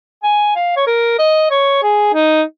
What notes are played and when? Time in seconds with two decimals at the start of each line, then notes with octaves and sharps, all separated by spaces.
0.23 G#5
0.55 F5
0.76 C#5
0.87 A#4
1.19 D#5
1.50 C#5
1.82 G#4
2.14 D#4